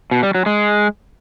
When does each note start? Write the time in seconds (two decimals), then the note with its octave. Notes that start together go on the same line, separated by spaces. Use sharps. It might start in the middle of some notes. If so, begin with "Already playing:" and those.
0.11 B2
0.23 G3
0.35 F#3
0.46 G#3